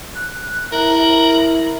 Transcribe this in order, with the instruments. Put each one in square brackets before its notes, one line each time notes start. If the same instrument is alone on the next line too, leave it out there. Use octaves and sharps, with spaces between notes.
[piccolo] F#6
[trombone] E4 [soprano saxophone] A#4 [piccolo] F#7